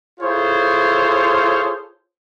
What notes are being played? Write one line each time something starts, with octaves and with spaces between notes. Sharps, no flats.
E4 F4 G#4 A4 C5 C#5